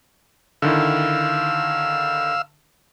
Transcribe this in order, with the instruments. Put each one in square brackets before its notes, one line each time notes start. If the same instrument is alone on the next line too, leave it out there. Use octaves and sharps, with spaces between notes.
[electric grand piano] D3 D#3 E4 [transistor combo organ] F5 E6